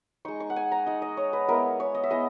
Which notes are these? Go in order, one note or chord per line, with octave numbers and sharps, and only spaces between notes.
G#3 D#4 C#6
C#6
F#5
G#5
A#5
G#3 D#4
D#5
C#5
B4
G#3 B3 E4 A#4
C#5
D#5
E5
G#3 B3 E4 D#5